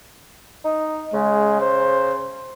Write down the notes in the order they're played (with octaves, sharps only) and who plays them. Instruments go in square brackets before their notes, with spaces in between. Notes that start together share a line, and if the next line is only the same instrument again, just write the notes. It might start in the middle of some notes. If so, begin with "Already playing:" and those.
[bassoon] D#4
[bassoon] C#3 [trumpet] G#3
[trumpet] C5